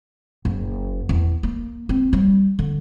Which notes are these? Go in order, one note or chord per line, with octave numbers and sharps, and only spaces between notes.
F#1
E2
A#3
C4
G3
D3